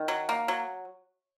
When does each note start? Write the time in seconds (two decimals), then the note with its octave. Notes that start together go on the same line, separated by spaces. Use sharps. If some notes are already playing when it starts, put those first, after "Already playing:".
Already playing: D#3
0.08 F#3
0.29 A#3
0.48 F#3